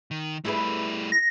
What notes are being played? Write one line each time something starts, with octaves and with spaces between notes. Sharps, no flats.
D#3
G3 A3 E4 G#4 B4
A#6